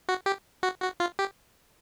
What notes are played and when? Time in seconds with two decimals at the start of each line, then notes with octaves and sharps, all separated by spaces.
0.09 F#4
0.26 G4
0.63 F#4
0.82 F#4
1.00 F4
1.19 G4